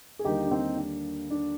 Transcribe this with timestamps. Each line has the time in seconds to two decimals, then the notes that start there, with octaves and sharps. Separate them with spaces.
0.19 G#4
0.24 D#2 D3 G3 A#3 D#4 G4
0.46 D4
0.51 C4 D#4
0.77 D4
1.30 D4